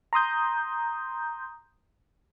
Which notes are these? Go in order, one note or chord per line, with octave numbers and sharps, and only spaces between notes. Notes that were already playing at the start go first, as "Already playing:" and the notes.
A#5 C6 D#6 G6